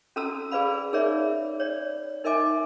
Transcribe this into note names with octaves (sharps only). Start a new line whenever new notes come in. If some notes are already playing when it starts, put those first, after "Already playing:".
C#4 F#4 A4 A5 A#5 E6
G#4 B4 D5 F5 B5
D#4 G#4 A#4 C#5 D5 E5
C#5 D5
D#4 A#4 D#5 E5 G#5 D6